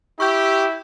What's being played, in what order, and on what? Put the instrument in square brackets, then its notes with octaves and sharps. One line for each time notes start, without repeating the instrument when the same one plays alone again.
[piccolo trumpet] E4 [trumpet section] G4 [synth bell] C#6 E6 G6